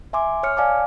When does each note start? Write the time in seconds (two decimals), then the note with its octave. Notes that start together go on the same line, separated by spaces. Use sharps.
0.13 E5 G#5 C6 D6
0.43 C#5 F6 C#7
0.57 D5 F5 G#5 A5 D6